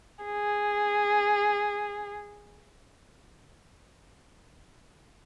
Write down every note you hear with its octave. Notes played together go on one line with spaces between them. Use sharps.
G#4